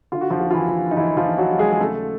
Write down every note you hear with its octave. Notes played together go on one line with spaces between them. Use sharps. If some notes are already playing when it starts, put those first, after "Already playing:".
D3 F4
F#4
F3 F4
D#2
F4
E3 E4
F3
D#4
D#2 E3 E4
F3 F4
D3
F#3 F#4
D#2
G#3 G#4
G#4
C#3 A3 A4